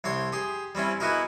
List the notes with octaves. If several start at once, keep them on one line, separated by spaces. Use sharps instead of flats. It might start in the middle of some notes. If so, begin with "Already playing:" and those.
C2 C4 C#5 C6
G4 G#4 C6
G3 C4 C#4 E4
B3 D#4 E4 F#4 G#4 A#4